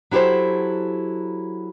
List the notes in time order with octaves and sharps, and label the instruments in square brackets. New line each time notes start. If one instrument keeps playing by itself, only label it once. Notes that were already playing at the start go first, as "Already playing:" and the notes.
[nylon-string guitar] F#3 E4 G4 A4 C5